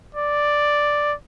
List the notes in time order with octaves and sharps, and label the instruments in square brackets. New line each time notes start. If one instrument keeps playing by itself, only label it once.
[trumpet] D5